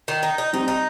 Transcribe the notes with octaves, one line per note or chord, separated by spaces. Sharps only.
D#3
D#4
D#4
G3 C4 D#4
D#4